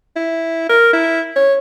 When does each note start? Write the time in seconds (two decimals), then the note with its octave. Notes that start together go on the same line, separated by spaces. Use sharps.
0.16 E4
0.69 A#4
0.93 E4
1.36 C#5